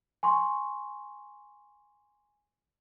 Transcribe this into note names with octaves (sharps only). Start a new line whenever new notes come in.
G#5 C6 C#6